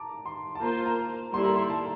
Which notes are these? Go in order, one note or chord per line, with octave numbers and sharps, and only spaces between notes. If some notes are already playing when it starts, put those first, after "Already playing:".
Already playing: A5 A#5 D6
C6
A5
A#3 F4 C5 A#5
A#5
G3 A#3 E4 A4 C6
A#5
C6
A5